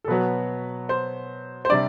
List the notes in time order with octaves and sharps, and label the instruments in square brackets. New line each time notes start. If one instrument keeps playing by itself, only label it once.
[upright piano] A4
[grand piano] B2 F#3 B3 [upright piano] B4
[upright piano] C5
C5
[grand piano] C3 G3 D4 [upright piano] D5